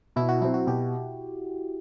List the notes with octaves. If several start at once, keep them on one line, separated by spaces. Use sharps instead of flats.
B2 E4
F#4
F#3 C4 E4
F#4
B2 G4